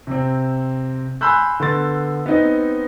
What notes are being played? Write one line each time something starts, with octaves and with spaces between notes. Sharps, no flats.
C3 C4
G#5 B5 C6 E6 F#6 G6
D3 B3 C6 A6
B3 C4 D#4 D#5